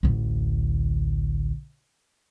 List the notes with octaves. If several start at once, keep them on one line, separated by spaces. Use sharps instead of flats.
A1 D2